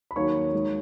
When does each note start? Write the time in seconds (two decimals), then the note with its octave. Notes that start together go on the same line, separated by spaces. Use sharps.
0.11 B5
0.16 D#2 D#3 F#3 C#5 C#6
0.53 D#3 G#3